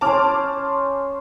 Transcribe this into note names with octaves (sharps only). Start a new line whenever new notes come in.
C#4 C5 A5 D6 F6